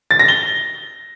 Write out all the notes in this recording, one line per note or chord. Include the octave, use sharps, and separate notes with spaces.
A6
A#6
G7